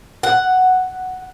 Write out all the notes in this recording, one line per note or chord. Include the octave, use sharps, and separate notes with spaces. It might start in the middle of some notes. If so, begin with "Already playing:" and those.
F#5